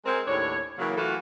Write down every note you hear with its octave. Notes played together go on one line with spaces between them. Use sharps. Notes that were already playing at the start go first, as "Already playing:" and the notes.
G#3 C4 A#4
D#2 A2 D4 C#5
C#3 E3 F#3 A#3
E3 F#3 A3 F4 F#4 A4